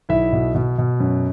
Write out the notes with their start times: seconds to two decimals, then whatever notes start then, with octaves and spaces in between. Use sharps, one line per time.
0.09 B1 E4 E5
0.32 B2
0.55 B2
0.78 B2
1.00 F#2